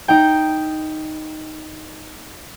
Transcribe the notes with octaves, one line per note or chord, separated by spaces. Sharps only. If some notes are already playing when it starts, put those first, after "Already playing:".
D#4 G5